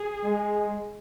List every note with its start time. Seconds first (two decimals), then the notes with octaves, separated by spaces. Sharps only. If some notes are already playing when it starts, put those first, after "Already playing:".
Already playing: G#4
0.24 G#3